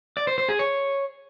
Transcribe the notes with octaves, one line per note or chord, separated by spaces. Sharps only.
D5
C5
C5
G#4
C#5